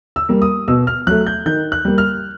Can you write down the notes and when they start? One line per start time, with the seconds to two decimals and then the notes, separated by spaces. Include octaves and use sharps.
0.16 E6
0.29 G3 A#3
0.42 D#6
0.68 B2 E6
0.87 F6
1.07 F#3 A3 F#6
1.27 G6
1.46 D#3 G6
1.72 F#6
1.85 G3 A#3
1.98 F6